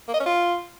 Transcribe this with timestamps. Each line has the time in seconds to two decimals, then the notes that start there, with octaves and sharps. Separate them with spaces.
0.08 A#3
0.14 D#5
0.20 C#4
0.26 F4